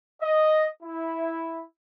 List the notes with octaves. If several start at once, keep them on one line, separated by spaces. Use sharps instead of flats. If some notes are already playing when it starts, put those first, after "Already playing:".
D#5
E4